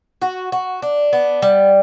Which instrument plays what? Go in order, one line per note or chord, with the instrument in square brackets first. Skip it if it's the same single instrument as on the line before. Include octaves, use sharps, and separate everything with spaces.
[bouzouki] F#4
F#4
D4
B3
G3